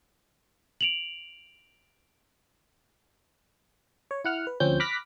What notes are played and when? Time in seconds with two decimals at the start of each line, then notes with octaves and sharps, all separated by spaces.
0.81 D7 F7 F#7
4.11 C#5
4.25 E4 F#5 F6
4.47 B4
4.60 D2 F3 C4 C#4 G6
4.80 B5 D6 F6 F#6 A#6 B6